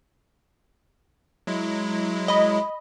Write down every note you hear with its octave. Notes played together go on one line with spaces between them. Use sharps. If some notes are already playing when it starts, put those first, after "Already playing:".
F#3 G#3 E4
D#5 B5